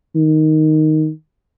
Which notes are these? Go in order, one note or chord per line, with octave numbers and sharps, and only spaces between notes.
D#3